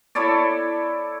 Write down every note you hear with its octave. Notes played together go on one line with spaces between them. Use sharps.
E4 A4 C#5 D5